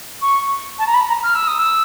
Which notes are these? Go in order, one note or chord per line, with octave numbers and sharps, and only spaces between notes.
C#6
A5
A#5
B5
A#5
F6
E6
D#6
E6